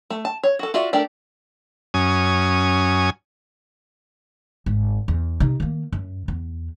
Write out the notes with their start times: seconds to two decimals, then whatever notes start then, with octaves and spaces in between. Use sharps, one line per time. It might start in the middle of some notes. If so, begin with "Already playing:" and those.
0.10 A3
0.25 A5
0.43 C#5
0.59 F#4 A4
0.74 F4 F#4 D5 E5
0.93 A3 D4 G4 A#4 D5
1.94 F#2 C#4 G#5 D#6
4.66 G#1
5.08 E2
5.40 C3 D#4
5.60 D#3 A#3
5.92 F#2
6.28 E2